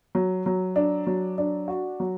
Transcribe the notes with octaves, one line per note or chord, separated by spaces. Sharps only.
F#3
F#3
D4
F#3
D4
F#4
F#3